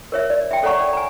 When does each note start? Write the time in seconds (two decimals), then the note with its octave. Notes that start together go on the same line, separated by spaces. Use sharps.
0.12 A#4 C#5 E5
0.30 D5
0.51 E5 G5
0.63 A4 C#5 D5 F#5 A#5 C#6
0.80 D5
0.93 G#5 A#5